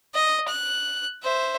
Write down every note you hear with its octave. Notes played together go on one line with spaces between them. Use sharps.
D#5
F#6
C5 E5